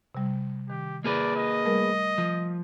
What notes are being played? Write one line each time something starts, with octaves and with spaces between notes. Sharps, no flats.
C3 G3
D#3 G4
A#3 G#4 B4 D5
D#5
G3 A3 A#4
F3